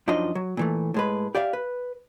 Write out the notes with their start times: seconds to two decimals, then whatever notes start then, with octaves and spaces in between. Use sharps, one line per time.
0.08 F#2 F3 D4 D#4 D#5 C6
0.35 F#3
0.57 A#2 E3 A3
0.94 A2 G#3 B4
1.35 G4 D5 E5 F5
1.53 B4